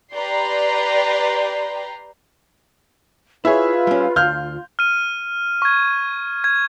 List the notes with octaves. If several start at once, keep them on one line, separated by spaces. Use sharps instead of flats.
G4 B4 D5 G5 A#5 C6
E4 F4 G#4 B4 C#5 E5
G3 C#4
D2 F6 G6
F6 D#7
C#6 G#6
G#6